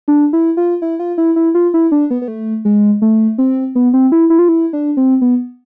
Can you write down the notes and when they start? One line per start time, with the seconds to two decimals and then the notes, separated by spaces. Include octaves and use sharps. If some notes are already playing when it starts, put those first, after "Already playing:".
0.08 D4
0.33 E4
0.57 F4
0.82 E4
0.99 F4
1.18 E4
1.36 E4
1.55 F4
1.74 E4
1.92 D4
2.10 B3
2.22 B3
2.28 A3
2.65 G#3
3.02 A3
3.38 C4
3.75 B3
3.94 C4
4.12 E4
4.30 E4
4.39 F4
4.48 E4
4.73 D4
4.97 C4
5.21 B3